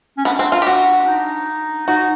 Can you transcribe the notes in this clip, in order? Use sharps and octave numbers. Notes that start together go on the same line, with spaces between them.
C#4
B3 D4
C4
F4
G4
F#4
D#4
D#4 F#4